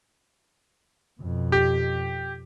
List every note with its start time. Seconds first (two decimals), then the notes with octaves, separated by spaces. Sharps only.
1.21 F2 B2
1.52 G4